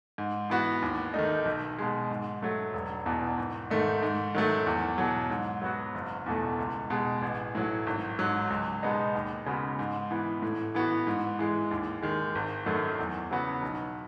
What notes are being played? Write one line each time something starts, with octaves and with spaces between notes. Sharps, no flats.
G#2
E3 B3 F#4
D#2
D#3 A3 D#4
B1
B2 G#3
G#2
F#3 A3
E1
E2 B2
G#1
G#2 D#3 A3 D#4
G#2
D#3 F#3 A3
E2
B2 F#3
G#2
F#3 B3 F#4
F#1
E2 B2 A3
C#2
B2 G#3
A1
A2 F#3
G#1
G#2 F#3
C#2
B2 G#3 B3 D#4
D#2
C#3 G#3 B3 F#4
G#2
E3 B3
A2
E3 B3 F#4
G#2
E3 G#3
D#2
D#3 G#3
G#1
F#2 D#3 F#3 A3
E2
C#3 F#3 B3 F#4
B1